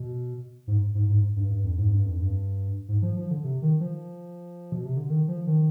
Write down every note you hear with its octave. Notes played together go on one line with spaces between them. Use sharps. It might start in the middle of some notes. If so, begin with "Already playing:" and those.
Already playing: B2
G#2
G#2
G#2
G2
G2
F2
G#2
G2
F2
G2
G#2
F3
F3
D3
C3
D#3
F3
B2
C3
D3
D#3
F3
D#3